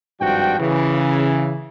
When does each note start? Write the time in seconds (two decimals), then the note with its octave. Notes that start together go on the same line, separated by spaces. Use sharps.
0.20 G#1 G2 F3 F#4 D5 G5
0.59 C#3 E3